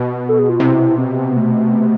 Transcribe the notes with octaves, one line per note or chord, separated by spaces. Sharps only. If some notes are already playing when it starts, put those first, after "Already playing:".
Already playing: B2
A4
G#4
F4
C3 E4
C4
B3
A3